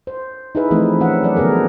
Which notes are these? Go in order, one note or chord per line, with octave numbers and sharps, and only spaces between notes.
C5
D#4 E4 G#4 B4 E5
E3 F3 A3 C4 D#4
E3 C#4 E5 F#5
F#3 A4 D5
D3 F3 B3 G#4 A#4